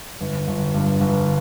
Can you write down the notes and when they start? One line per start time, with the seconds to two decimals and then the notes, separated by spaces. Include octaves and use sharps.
0.20 G1
0.48 G1
0.74 G2
1.01 G1